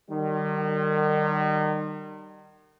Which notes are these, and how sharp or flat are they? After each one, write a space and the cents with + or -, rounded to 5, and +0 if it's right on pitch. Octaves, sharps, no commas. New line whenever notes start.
D#3 -35 G3 -20